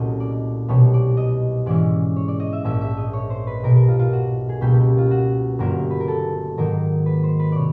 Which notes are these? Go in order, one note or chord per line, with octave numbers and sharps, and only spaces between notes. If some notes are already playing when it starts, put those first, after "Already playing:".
Already playing: C2 A#2 F#3 A3 C#4 D#5
D5
C2 B2 G3 C#5
D5
D#5
G#2 E3 G#3 C#4 E4 D5
C#5
D5
D#5
E5
A#1 G#2 F3 A#3 E5
E5
D#5
C#5
C5
B4
B1 B2 G3 A#4
A#4
F4
F4
F#4
G#4
C#2 B2 G3 A#3 G4
G4
F4
F#4
G1 G2 D3 F#3 A#3 A#4
B4
A#4
A4
G#2 D#3 F#3 A#3 D#4 A#4
B4
C5
B4
C3 C#5 D5